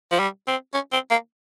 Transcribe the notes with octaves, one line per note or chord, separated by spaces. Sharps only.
F3
G3
C4
C#4
C4
A#3